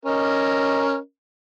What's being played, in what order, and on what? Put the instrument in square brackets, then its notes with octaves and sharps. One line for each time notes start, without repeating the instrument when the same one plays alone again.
[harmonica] C#4 A#4 D#5